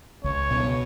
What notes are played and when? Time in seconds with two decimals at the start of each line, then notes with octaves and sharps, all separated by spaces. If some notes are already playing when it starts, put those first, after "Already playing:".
0.24 C#2 C#5
0.50 B2